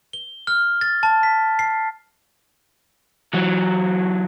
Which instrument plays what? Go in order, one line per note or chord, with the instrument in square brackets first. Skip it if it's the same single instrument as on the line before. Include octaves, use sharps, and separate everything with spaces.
[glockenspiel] G7
F6
A6
A5
B6
C7
[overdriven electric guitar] E3 F#3